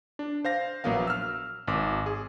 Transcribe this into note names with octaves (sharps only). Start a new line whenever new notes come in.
D4
C5 F5 A#6
A#1 F#3 A#3 B3 F5
E6 F6
G#1 D6
G#4